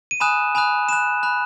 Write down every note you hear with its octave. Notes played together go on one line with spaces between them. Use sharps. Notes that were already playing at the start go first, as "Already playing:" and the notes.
D#7
G#5 B5 D#6 F#6 E7
G#5 B5 D#6 F#6
B5 F#6 E7
B5 F#6